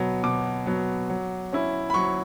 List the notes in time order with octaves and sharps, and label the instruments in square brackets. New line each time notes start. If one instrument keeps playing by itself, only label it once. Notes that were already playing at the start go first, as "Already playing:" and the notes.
Already playing: [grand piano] B2 F#3 B3
B2 D6
F#3 B3
F#3
C#4 E4
B5
F#3 C#6